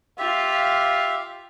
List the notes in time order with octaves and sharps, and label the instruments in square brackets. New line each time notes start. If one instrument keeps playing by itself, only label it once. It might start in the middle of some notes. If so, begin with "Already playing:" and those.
[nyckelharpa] F4 [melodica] G4 E5 [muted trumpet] F5